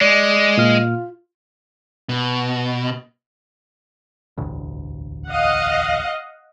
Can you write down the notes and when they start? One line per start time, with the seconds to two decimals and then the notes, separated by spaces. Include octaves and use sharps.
0.01 G#3 D5
0.57 A#2 F4 F6
2.09 B2
4.37 E1 A1 D2
5.26 D#5 F5 F#5